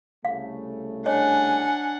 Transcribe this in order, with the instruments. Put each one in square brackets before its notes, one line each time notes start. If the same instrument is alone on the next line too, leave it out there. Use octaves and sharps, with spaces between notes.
[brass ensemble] C2 C#3 A3 [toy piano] F5
[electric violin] D4 F#5 [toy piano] C#5 D#5 [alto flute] G#5